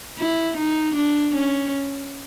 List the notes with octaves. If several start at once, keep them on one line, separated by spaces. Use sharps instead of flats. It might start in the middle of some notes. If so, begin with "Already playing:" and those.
E4
D#4
D4
C#4